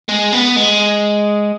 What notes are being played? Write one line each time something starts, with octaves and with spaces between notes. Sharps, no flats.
G#3
B3
G#3